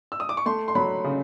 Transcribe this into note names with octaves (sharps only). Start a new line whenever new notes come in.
E6
D#6
D6
C#6
A3 C6
C6
F#3 B5
C#3